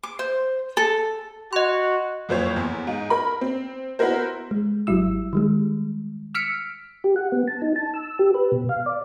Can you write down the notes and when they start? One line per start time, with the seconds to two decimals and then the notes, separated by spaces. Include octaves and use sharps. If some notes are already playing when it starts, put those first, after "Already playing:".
0.03 D6
0.19 C5
0.77 A4
1.53 F#4 D#5 C6
2.29 F#1 F2 C5 C#5
2.56 E2
2.87 G#2
3.10 A#4 B5
3.41 C4
3.99 B3 E4 F#4 A#4 C5
4.51 G#3
4.87 G#1 F#3 G3 E4 E6
5.33 D#3 G3 G#3
6.35 E6 F6 B6 C#7 D7
7.04 G4
7.16 F#5
7.32 B3
7.48 A5
7.62 D#4
7.76 A5
7.94 E6
8.19 G4
8.34 B4
8.52 B2
8.69 F5
8.86 D5